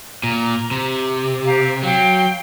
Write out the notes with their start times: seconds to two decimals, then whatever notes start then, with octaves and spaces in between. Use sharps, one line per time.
0.23 A#2 A#5
0.71 C3
1.44 G4 F5 A#5
1.83 F#3 F5 G5